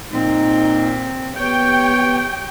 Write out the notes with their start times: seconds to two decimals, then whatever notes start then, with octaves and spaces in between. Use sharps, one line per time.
0.12 A#2 C4 D#4
1.37 B3 G4 C#5 G5